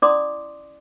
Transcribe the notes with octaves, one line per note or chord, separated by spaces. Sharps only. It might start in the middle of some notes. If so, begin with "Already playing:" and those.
C#4 E4 D5 C6 D6 D#6